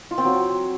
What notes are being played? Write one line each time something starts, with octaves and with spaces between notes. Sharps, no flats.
F4
C4
F#3